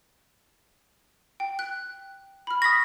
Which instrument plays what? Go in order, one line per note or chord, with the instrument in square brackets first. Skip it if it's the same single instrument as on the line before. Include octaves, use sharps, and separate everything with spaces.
[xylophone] G5
F#6
B5 F6
[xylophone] C#6 D#6 [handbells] A#6 B6